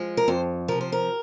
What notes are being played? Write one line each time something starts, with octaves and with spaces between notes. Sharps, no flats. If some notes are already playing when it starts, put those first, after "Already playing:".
Already playing: F3 G#3
A#4
F2 C5
C3 F3 A#4
C5
A#4